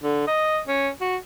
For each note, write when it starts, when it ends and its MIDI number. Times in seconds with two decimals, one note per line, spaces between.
0.03 0.24 50
0.27 0.60 75
0.68 0.89 61
1.01 1.17 66